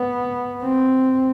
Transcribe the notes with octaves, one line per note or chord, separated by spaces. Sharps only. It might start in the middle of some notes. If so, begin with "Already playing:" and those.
Already playing: B3
C4